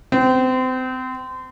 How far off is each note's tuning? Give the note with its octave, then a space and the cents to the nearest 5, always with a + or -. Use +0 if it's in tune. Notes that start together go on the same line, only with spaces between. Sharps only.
C4 -30